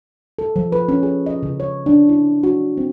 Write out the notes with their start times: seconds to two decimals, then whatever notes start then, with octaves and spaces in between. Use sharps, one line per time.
0.39 A4
0.56 F3
0.72 B4
0.89 C#4
1.03 G#4
1.26 D#5
1.43 C#3
1.60 C#5
1.86 D4
2.09 E4
2.43 F#4
2.78 C4